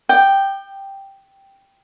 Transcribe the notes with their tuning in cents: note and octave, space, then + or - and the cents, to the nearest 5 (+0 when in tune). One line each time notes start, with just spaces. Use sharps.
G5 +0 D6 +45